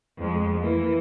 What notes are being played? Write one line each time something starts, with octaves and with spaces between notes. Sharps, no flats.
F2 G#3
E3 A#3